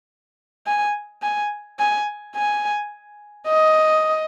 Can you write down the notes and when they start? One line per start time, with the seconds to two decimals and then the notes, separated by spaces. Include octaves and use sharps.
0.67 G#5
1.22 G#5
1.79 G#5
2.36 G#5
3.48 D#5